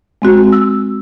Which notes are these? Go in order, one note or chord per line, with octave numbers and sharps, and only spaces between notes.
G#3 C4 F#4
E6